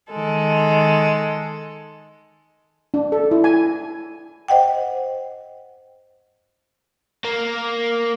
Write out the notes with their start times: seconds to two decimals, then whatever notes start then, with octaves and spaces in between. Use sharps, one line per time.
0.11 D#3 G#3 A4
2.94 D4
3.12 A4
3.31 E4
3.44 G#5
4.48 C5 D#5 F#5 G5
7.25 A#3